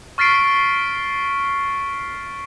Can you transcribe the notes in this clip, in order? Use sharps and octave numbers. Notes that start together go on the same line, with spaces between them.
C#6 F6 A6 B6 C7 D7